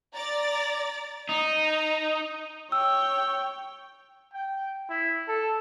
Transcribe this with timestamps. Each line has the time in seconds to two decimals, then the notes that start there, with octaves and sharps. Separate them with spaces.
0.15 D5 A#5 A6
1.29 D#4 A#5
2.72 C#5 G5 E6
4.33 G5
4.90 E4
5.28 A4